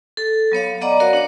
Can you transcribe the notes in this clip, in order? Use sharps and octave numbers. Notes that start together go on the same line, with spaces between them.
A4
F#3 B3 C#5 F5
B3 D5 D#5 F#5 A#5 D6
F#4 A#4 C#5 D5 F5
D4 C#5 D6